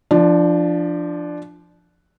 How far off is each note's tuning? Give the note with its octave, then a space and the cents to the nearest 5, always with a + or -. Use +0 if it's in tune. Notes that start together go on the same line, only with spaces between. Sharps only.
F3 -15 D4 +10